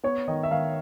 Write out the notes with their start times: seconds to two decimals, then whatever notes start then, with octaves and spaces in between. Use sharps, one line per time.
0.03 B3 C#5
0.28 D#3 D#5
0.43 E5
0.51 D#3 F5